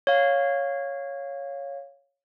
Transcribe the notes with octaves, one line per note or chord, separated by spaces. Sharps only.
C#5 F5